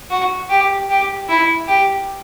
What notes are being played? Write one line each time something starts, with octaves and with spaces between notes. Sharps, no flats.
F#4
G4
G4
E4
G4